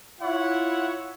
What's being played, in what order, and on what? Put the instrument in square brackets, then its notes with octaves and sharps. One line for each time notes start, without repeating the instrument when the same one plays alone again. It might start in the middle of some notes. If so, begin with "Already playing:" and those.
[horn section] E4 F4 C#5 E5 F#5